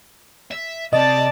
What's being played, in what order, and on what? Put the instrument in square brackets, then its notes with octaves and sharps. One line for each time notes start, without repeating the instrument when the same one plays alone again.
[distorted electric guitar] E5
[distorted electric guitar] C3 C4 [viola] D5 A5 [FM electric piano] D#5